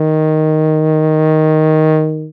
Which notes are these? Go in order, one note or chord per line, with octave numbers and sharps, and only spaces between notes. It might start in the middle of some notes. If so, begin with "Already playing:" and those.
Already playing: D#3